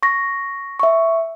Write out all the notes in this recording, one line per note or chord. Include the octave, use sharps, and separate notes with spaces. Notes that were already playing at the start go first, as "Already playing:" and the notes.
C#6 A#6
E5 C#6